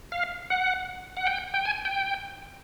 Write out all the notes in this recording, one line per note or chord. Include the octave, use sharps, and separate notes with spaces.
F5
F#5
F#5
G5
G5
G#5
G5